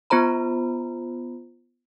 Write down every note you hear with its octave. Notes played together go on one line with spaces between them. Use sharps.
B3 F4 C5 A#5 B5